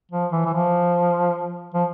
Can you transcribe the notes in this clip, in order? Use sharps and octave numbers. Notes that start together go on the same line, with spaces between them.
F3
E3
E3
F3
F3